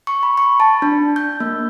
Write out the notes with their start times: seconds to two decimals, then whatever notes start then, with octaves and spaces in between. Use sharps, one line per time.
0.07 C#6
0.23 B5
0.38 C#6
0.60 A5
0.82 D4
1.16 G6
1.40 A#3